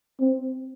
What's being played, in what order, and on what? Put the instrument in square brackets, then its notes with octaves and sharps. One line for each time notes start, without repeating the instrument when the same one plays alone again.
[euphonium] C4